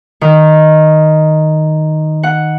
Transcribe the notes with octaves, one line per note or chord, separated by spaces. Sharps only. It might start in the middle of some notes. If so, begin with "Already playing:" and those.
D#3
F#5